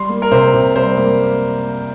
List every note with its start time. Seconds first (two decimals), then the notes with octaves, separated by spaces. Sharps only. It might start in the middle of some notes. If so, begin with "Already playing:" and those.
Already playing: G3 C6
0.09 A#3
0.22 A#4
0.31 C3 C5
0.54 C3
0.76 G3 C5
0.97 A#3